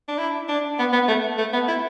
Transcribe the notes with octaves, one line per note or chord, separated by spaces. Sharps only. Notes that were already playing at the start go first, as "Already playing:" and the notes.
D4
E4
D4
B3
B3
A3
A3
B3
E4